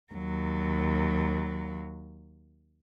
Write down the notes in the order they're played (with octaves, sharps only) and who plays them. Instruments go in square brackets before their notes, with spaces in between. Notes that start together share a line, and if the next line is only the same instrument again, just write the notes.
[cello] D#2 F#3